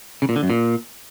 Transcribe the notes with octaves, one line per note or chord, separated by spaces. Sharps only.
C#3
A#2
D3
F#2
A#2